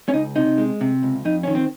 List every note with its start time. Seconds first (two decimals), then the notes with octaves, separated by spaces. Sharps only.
0.08 C#4
0.13 C#2 D#4
0.36 C3 D#4
0.58 G#3
0.81 C3
1.03 C#2
1.25 F2 D#4
1.43 D#3 C#4
1.55 C4